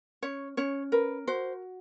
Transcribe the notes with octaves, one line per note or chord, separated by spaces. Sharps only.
C#4 C#5
C#4 C#5
A#4 B4
F#4 C5